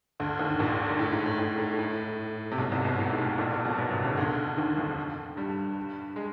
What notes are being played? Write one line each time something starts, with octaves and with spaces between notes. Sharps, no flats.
D2 D3
D#2 D#3
A#1 A#2
G#2
A2
G#2
A2
A2
A2
A2
C3
B1 B2
C2 C3
B1 B2
A2
G#2
A2
A#1 A#2
A#1 A#2
B1 B2
B1 B2
C2 C3
C#2 C#3
D#3
D2 D3
D#2 D#3
F2 F3
G2 G3
G#3